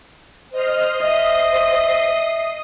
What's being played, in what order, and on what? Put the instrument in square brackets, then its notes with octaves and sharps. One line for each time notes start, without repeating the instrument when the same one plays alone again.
[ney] C5 [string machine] D#5 F6 C7
[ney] C5 [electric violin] D#5 [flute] E5 [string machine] D#6 C7